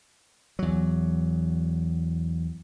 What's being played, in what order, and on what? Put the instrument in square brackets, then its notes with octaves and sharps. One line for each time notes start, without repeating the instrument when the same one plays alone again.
[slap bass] E2 F#3